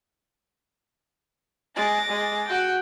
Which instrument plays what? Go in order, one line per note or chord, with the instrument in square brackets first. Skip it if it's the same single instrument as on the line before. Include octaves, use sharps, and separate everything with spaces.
[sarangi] G#3 [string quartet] D6 A6 A#6
[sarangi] G#3
[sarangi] F#4 [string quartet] G5